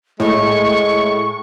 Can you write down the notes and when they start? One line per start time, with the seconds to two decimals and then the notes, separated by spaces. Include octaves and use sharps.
0.20 A2 G#3 C#6